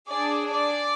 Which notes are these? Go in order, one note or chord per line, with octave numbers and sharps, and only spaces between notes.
D4 G#4 D5
D5